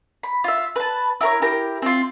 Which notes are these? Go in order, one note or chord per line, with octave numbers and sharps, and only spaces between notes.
B5
F4 E5
B4 A5
E4 A#4 C#5
E4 G4 A#4
C4 F4